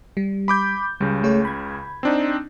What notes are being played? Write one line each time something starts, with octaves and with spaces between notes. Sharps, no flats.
G3
B5 D6 G6
C#2 C#3 G3
A3 G#4 C#5
B5 G#6
C4 D4 D#4